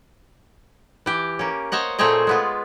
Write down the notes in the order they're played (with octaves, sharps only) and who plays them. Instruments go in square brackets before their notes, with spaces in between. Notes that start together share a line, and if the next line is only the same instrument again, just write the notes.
[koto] E3 G4
A#3 C#4
C5 C#5 D#5 F#5
A#2 A3 C4 G#4 C#5 D#5
G#3 B3 F4